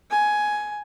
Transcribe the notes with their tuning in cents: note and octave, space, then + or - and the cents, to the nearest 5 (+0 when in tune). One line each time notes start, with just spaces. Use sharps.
G#5 +10